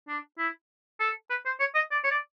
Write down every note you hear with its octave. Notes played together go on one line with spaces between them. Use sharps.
D4
E4
A4
B4
C5
C#5
D#5
D5
C#5
D5